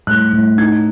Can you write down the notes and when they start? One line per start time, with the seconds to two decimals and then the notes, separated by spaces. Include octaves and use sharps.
0.07 A2 F#6
0.33 A2
0.58 D#4 G#6